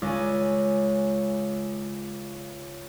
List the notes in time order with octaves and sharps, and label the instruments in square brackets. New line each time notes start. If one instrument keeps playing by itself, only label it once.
[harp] C#2 G#5